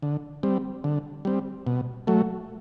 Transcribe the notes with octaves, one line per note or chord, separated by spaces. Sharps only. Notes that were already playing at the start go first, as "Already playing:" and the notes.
D3
G3 C4
D3
G3 C4
B2
F#3 A3